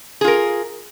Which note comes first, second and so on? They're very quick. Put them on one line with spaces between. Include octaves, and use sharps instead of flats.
G#4 F4 A#4